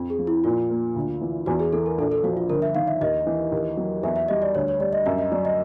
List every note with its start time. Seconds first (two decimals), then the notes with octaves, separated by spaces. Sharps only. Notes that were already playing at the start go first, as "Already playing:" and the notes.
Already playing: F2
0.10 G#4
0.19 F3
0.27 E4
0.44 A#2 F4
0.70 A#3
0.96 D2
1.21 E3
1.46 E2 F#4
1.60 G#4
1.73 E3 A4
1.86 A#4
1.98 A#1 A4
2.12 A4
2.24 F3 F#4
2.37 F4
2.49 G1 A#4
2.62 E5
2.75 D#3 F5
2.88 E5
3.01 D#2 D#5
3.27 E3
3.52 D#2
3.77 F#3
4.03 E2 E5
4.16 E5
4.28 G3 D#5
4.42 D5
4.55 D2 C#5
4.68 C#5
4.80 G3 D5
4.93 D#5
5.06 F#2 E5
5.18 D#5
5.32 F#3 D5
5.45 D#5